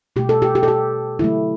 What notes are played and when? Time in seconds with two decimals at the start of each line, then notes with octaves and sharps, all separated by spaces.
0.16 B2 A3 G4
0.29 A4
0.42 G4
0.55 G4
0.63 A4
0.68 G4
1.19 D3 F#3 A3 E4